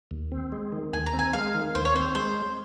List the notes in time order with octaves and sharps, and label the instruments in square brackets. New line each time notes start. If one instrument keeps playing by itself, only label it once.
[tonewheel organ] D#2
C4
G#3
D#3
[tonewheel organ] D#2 [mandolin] G#5
[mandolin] A#5
[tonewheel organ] C4
[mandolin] G#5
[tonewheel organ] G#3 [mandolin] F5
[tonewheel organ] D#3
[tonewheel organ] D#2 [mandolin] C5
[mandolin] C#5
[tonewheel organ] C4 [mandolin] C5
[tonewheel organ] G#3 [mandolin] C5